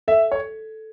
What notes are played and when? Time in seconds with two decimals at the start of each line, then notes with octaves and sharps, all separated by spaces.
0.08 A4 E5
0.32 C#5